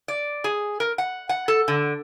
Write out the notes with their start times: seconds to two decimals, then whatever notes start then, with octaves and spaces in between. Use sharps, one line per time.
0.08 D5
0.44 G#4
0.80 A#4
0.98 F#5
1.29 F#5
1.48 A4
1.68 D3